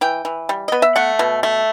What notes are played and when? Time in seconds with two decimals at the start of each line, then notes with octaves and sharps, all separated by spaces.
0.01 E3 G5
0.25 E3
0.49 G3
0.68 B3 D#5
0.82 E5
0.96 A3 F#5
1.19 B2
1.43 A3